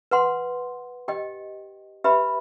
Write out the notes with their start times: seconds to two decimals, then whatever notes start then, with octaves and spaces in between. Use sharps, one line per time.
0.11 B4 F#5 C6
1.08 G4 D#5 G5
2.04 G4 B4 E5 B5